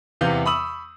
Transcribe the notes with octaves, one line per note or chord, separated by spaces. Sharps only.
E2 C3 B3 F5 G6
B5 C#6 D#6 E6 F#7